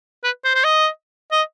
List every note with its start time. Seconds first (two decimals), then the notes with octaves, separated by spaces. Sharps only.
0.24 B4
0.44 C5
0.55 C5
0.64 D#5
1.32 D#5